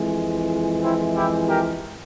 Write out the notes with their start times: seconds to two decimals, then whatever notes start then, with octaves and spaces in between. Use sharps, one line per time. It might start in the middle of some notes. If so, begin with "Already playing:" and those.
Already playing: F2 E3 G#3
0.83 C4 E4
1.16 E4 G4
1.49 G4 A#4